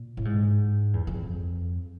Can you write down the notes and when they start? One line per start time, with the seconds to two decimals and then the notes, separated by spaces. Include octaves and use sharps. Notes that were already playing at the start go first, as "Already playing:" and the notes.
Already playing: A#2
0.17 A2
0.25 G#2
0.93 E2
1.07 F2